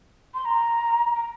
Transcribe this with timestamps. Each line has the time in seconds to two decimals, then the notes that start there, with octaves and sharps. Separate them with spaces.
0.34 C6
0.45 A#5
1.15 A#5